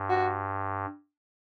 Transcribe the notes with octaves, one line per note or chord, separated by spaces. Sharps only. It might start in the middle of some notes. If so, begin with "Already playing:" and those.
Already playing: G2
F#4